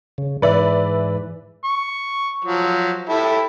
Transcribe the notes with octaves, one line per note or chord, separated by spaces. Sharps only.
C#3
G#2 E3 B4 D5 E5
C#6
F3 F#3
E4 G4 A4